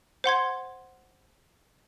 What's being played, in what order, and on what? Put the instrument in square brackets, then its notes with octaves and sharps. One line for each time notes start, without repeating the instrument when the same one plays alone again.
[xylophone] C5 F#5 C6 G#6